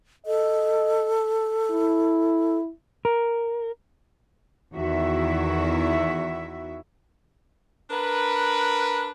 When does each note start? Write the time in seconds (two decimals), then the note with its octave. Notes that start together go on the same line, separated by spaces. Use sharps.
0.26 A4 D#5
1.71 E4
3.05 A#4
4.74 E2 D#3 E4 F#4 E5
7.91 D4 A#4 B4